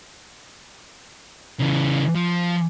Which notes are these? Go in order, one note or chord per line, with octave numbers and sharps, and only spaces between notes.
C#3 E3
F3